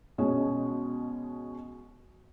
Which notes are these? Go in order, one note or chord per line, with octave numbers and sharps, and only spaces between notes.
B2 G#3 C#4